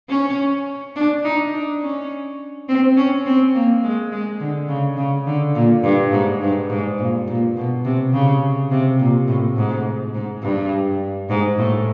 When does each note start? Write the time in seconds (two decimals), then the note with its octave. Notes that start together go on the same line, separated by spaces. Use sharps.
0.09 C#4
0.96 D4
1.24 D#4
1.53 D4
1.82 C#4
2.69 C4
2.97 C#4
3.26 C4
3.55 A#3
3.84 G#3
4.12 G#3
4.40 D3
4.69 C#3
4.97 C#3
5.27 D3
5.55 A#2
5.84 G2
6.12 G#2
6.41 G2
6.70 G#2
6.99 A#2
7.28 A#2
7.57 B2
7.85 C3
8.13 C#3
8.71 C3
8.99 A#2
9.28 A2
9.57 G#2
10.14 G#2
10.43 G2
11.30 G#2
11.58 A2